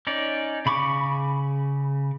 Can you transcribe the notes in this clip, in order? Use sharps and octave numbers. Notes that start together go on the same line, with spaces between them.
C#4 D#4 D5
C#3 B5 C#6 D6